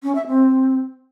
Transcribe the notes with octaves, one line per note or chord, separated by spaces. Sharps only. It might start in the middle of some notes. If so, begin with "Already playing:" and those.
C#4
E5
C4